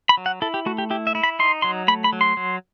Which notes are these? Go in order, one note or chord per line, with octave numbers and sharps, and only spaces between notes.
B5
F#3
F#5
E4 A4
G4
A3 F#4
G4
E4 G4
E5
E4
B5
D#4 C6
F#3 C6
A3 B5
B5
F#3
C6
F#3